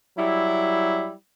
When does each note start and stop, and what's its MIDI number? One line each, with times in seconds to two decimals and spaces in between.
0.17 1.13 54
0.17 1.13 55
0.17 1.13 64